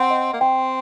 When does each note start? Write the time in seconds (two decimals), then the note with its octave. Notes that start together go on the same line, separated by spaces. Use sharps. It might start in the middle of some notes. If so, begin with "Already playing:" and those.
Already playing: C4 F#5
0.10 D#5
0.33 A#3
0.41 C4 G5